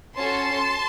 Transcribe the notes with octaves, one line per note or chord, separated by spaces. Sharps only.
C#4 F#4 A4 A5 C6